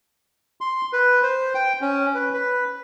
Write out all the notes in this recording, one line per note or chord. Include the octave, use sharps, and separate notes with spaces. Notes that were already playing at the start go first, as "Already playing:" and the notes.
C6
B4
C5
G5
C#4
B4
B4